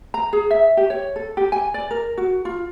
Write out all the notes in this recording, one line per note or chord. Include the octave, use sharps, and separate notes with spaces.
A#5
G#4
E5
G4
C#5
A4
G4
G#5
D5
A#4
F#4
F4